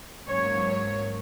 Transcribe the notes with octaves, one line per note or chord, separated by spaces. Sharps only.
G#2 F#3 A#3 C#4 C#5
C#5